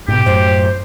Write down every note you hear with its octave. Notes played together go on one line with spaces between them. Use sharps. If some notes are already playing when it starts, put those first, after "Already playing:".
G#2 B2 G4
F#2 A2 C5